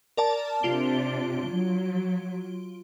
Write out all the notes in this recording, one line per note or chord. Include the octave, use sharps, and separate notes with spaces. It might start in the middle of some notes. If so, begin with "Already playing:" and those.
A#4 D5 A5
C3 D4 F4 D7 G7
F#3